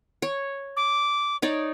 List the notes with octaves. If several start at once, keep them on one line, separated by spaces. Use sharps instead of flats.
C#5
D6
D#4 C#5 D5